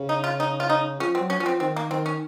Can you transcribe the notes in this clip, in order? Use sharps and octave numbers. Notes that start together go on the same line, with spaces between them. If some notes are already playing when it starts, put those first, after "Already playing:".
Already playing: C#3
D#4
F4
D#4
F4
D#4
F3 C#4
C4
F#3
C#4
F3 C#4
C4
D#3 C4
A#3
D#3 C4
C#4